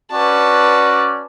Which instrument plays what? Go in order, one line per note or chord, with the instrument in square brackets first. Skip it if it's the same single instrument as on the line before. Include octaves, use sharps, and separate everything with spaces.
[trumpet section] C#4 F#4 D5 [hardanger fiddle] B4 A5